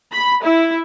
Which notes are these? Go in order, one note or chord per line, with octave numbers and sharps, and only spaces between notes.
B5
E4